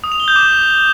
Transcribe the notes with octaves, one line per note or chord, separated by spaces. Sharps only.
D#6
F7
G7
G6
D6